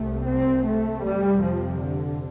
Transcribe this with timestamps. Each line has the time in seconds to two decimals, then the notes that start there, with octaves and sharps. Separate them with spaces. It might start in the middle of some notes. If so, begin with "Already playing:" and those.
Already playing: C2 C3 A3
0.26 C4
0.65 A3
1.04 F2 C3 G3
1.43 F3
1.82 D3